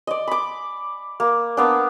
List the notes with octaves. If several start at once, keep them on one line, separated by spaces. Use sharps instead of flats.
D5 D#5
B5 D6
A#3
A#3 B3 D4